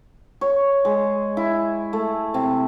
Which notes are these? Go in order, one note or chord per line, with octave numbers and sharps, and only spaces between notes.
C#5
G#3
E4
A3
C3